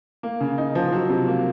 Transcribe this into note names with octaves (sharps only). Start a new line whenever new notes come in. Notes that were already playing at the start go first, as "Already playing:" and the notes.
A#3
C#3
D#4
F3
F#3
C3
A#3